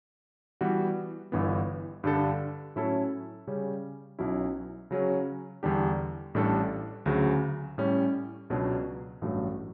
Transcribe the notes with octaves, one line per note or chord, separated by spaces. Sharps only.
E3 G3 B3 F#4
G1 G2 E3 B3
G2 D3 G3 D4 A4
A2 F#3 C#4 E4 A4
C#3 G3 C#4
B1 B2 F#3 C#4 E4
C#3 F#3 C#4
E2 D3 G3 D4 G4
A1 A2 G3 D4 A4
D2 C#3 F#3
A2 G3 C#4
C#2 B2 F#3 B3 D4
A1 G2 F#3 A3